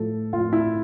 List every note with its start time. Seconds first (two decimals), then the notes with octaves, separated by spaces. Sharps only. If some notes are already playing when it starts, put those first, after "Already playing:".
Already playing: A2 F3 A4
0.33 A2 F4
0.38 F3
0.53 E4